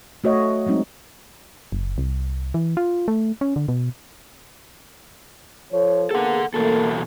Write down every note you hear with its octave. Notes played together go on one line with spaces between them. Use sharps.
A3 F#4 C#5 D#5
F#3 G#3 C4 D#4
F#1
C2
E3
F4
A3
C#4
D3
B2
F3 A4 C#5
A#3 B3 G#4 A4 F#5
E2 B2 A3 A#3 A4